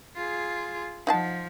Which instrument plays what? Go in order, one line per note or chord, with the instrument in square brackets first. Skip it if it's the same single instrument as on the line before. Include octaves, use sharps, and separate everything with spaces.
[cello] F4 G#4
[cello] F3 [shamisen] D#4 F#5 A5